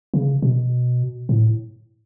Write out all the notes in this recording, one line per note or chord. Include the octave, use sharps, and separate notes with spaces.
C#3
B2
A2